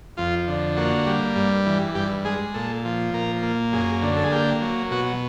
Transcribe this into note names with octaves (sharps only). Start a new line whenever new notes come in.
F2 F4
D3
A#3 F#4
G3
G2
E3
G2 G4
G#3 G#4
A#2 A4
F3
A#2 A#4
A#3
F#2 G#4
D3
A4
G#4
A#3 G4
F#3
B2 F#4